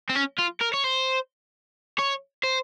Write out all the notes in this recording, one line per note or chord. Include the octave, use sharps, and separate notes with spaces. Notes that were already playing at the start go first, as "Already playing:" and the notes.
C4
C#4
F4
A#4
C#5
C5
C#5
C5